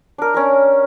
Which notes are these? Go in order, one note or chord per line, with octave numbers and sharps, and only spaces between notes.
D4 A#4
C#4 D4 A#4